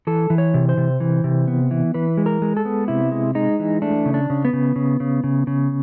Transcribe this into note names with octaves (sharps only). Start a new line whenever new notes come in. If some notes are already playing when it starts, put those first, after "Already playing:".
E3 A4
E3
C#5
C3
C5
C3
E3
C3
B3
E3
E3 B4
G#3
A#4
G#3
A4
B3
C3 E4
G#3
G#3 D#4
E3
A3 D4
C#3
D4
C#3
B3
C#3
C#3
C#3
C#3
C#3